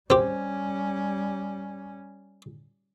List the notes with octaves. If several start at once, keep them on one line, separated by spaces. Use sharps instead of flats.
G3 C4 C#4 G4